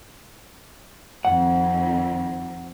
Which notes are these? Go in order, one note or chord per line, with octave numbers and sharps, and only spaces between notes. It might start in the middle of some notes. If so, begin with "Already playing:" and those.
F2 D#3 C4 F#5